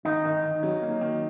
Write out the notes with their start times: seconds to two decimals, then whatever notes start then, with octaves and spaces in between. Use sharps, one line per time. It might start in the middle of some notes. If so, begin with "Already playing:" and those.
0.05 D#3 D#4
0.25 D#3
0.43 D#3
0.63 F#3
0.82 A#3
1.01 D#3